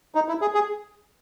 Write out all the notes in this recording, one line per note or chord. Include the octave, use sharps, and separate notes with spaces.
D#4
E4
G#4
G#4